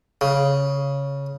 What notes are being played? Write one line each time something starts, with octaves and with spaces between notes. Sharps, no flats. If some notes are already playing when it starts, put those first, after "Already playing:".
C#3